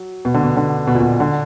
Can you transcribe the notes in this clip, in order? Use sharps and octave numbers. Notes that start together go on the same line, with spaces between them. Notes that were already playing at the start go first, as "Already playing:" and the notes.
Already playing: F#3
B2
D3
B2
D3
B2
A#2
B2
D3